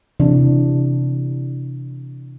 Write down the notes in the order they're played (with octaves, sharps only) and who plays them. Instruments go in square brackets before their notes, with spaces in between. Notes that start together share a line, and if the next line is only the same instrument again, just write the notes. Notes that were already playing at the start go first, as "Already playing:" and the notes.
[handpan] C3 E3 D4